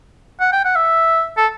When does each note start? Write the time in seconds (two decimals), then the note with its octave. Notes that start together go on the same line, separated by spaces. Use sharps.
0.40 F#5
0.52 G5
0.64 F#5
0.76 E5
1.37 A4